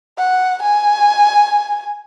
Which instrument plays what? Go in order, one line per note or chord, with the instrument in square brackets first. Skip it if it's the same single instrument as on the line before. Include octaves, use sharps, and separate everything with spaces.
[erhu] F#5
G#5